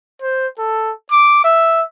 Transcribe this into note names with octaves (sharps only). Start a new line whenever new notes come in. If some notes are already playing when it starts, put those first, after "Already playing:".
C5
A4
D6
E5